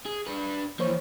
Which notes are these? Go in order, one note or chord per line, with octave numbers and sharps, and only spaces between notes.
G#4
D4 B4
E3 F3 A#3 C5 C#5